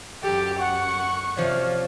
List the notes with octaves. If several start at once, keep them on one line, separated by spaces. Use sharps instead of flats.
F#2 G4 A4
F#5 C#6
C3 F3 C#5 D5 F5